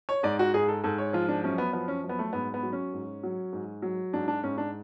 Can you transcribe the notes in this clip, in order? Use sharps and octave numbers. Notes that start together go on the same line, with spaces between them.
C#5
G#2 D5
F#4
G#2 G#4
A4
G#2 A4
C#5
F3 F4
D4
F#2 C#4
B3
F3 B3
C#4
F#2
B3
A3
G#2 B3
B3
F#3
C#4
G#2
F#3
G#2
F#3
G#2 D4
D4
G#2 C#4
D4